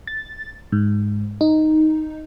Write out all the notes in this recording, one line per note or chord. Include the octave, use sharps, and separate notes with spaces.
A6
G#2
D#4